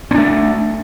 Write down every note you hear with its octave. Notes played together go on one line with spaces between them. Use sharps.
A3 C4 D4